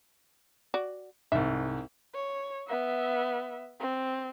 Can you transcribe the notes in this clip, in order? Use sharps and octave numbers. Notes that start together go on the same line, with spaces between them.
F#4 D5
C2 G#2 E5
C#5
B3 E5
C4